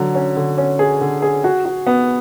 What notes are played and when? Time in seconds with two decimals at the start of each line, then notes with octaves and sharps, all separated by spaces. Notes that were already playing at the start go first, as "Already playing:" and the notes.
Already playing: D3 F#3
0.15 C#4
0.37 D3
0.58 C#4
0.79 G#4
1.01 D3
1.22 G#4
1.44 F#4
1.65 F#4
1.87 B3